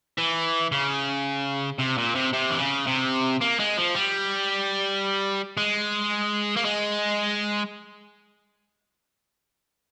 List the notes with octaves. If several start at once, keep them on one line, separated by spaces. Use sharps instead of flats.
E3
C#3
C3
A#2
C3
C3
E3
C#3
C3
A#3
G#3
F3
G3
G#3
A#3
G#3